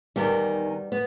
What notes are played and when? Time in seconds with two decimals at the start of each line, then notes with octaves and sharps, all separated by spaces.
0.16 E2 D#3 G3 B3
0.92 B3